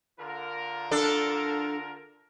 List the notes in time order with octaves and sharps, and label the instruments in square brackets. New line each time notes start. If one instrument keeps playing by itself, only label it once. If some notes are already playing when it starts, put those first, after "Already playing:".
[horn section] D3 F4 A#4
[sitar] D4 A4